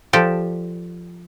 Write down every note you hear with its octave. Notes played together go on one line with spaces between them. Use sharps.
F3 G4 A4 D5